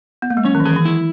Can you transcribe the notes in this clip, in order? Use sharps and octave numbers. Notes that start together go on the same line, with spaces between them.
B3
A#3
G#3
F#3 C#4
D#3
E3
D#3 G#4
E3
E4